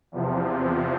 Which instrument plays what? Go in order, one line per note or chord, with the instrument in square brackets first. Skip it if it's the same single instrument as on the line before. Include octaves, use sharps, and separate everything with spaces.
[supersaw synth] E2 C3 F3